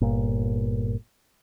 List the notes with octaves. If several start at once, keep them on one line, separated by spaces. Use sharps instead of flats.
G1 A#2